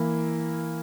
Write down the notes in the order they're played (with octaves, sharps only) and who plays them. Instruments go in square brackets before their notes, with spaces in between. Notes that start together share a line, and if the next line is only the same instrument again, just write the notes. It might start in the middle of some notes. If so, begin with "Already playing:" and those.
Already playing: [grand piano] E3 A#3 E4